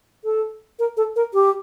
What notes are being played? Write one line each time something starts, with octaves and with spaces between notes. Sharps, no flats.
A4
A#4
A4
A#4
G4